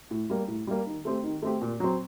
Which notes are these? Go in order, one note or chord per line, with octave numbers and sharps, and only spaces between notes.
A2
G3 A#3
A2
G3 A#3
D#3
A3 C4 G4
D#3
A3 C4 G4
A#2
F#3 C4